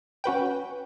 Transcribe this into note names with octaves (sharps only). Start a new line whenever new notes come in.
C#4 F#4 B4 G5